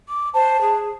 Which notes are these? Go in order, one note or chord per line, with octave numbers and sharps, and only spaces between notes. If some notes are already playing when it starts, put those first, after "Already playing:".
D6
C5 A5
G#4